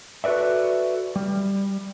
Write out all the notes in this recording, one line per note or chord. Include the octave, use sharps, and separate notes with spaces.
F#4 A4 B4 D5 E5
G3